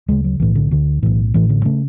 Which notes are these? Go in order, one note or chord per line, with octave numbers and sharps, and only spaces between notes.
D2 C#3 G#3
F#3
B1 A2 E3
D3
D2 D3
B1 A2 E3
A1 A2 E3
D3
C#3 A3